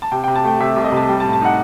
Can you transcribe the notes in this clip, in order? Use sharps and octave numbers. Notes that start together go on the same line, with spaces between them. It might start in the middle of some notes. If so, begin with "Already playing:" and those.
A5
C3 G5
G5
C3
A5
A3 G5
C3 E5
C2
D#5
C3 A5
G3 G5
A5
A2
A5
D#4 F#5